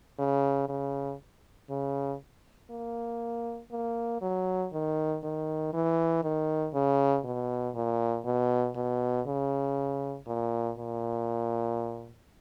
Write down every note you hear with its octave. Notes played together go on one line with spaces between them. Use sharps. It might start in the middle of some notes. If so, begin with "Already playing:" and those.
C#3
C#3
C#3
A#3
A#3
F#3
D#3
D#3
E3
D#3
C#3
B2
A#2
B2
B2
C#3
A#2
A#2